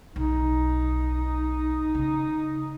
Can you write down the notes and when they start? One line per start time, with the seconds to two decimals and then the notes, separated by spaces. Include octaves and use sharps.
0.16 B1 D#4
1.95 C#3